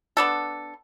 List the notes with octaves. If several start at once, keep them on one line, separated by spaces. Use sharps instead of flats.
B3 D4 A4